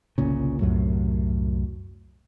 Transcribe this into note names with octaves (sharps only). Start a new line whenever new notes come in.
G1 C2 A#2 C#3
C2 F#2 A2 F#3